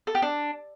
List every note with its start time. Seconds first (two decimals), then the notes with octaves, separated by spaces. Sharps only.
0.07 A4
0.15 G4
0.22 D4